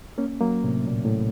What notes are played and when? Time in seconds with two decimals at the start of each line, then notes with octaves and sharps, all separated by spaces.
0.18 A#3 C#4
0.40 F#3 A#3
0.64 A2 C3
0.87 A#2
1.05 A2